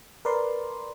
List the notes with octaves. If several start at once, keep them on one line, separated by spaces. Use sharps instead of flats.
A#4 B4 D5 C6